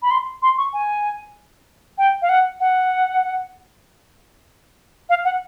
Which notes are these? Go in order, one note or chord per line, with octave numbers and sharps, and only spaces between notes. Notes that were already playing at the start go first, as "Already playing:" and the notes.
B5
C6
C6
C#6
G#5
G5
F5
F#5
F#5
F5
F#5